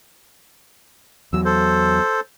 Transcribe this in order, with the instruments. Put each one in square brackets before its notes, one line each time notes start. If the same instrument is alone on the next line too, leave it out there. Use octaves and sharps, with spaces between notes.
[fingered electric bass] E2 F#3 [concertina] E6
[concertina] A4 C5